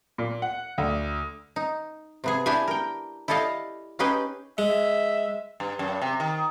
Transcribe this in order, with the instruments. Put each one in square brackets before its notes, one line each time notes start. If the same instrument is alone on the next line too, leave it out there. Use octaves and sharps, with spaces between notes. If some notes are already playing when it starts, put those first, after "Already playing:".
[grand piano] A#2
F#5
D2
[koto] D#4
C3 B3 G#4
D4 E4 G4 G#4 G#5
A#4 G5
E4 G4 A4 D5 D#5 F5
C#4 D#4 G4 G#4 B4 G5
[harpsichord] G#3 [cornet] E5
[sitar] G2
F#2
C3
D#3